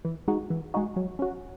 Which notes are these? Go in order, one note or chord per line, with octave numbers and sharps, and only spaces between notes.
E3
G#3 D#4 F#4
E3
G#3 D#4 F#4
F#3
C#4 F#4